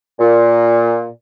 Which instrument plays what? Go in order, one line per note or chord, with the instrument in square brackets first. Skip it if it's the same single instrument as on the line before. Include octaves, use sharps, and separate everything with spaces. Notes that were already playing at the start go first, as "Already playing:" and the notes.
[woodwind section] A#2